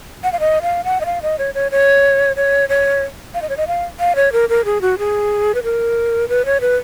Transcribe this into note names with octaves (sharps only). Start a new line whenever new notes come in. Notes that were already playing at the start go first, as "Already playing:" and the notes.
F#5
F5
D#5
F5
F#5
D#5
F5
D#5
C#5
C#5
C#5
C#5
C#5
F5
D#5
C#5
D#5
F5
F5
C#5
A#4
A#4
G#4
F#4
G#4
B4
A#4
B4
C#5
B4